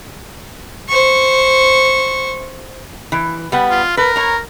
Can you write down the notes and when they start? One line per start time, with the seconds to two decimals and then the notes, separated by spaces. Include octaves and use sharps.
0.89 C5 C#6
3.12 E3
3.52 G3 B3 F#5
3.70 F4
3.97 A#4 B4
4.16 C#5 A#5